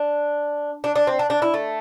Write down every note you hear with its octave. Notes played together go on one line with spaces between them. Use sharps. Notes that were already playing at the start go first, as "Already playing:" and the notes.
Already playing: D4
D4
D4
C4
D4
D4
E4
A3